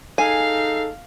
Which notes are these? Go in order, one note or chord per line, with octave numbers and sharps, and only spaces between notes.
D#4 G#4 A4 F5 G#5 C7